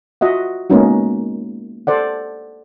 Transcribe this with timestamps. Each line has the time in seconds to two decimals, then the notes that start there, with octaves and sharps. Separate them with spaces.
0.21 F4 F#4 D#5 E5 F#5
0.70 G#3 A#3 B3 C#4 D#4 F#4
1.87 A4 C5 D5 F#5